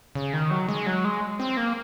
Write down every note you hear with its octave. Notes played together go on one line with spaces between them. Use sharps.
C#3
D#3
F#3
G#3
F#3
G#3
C4
A#3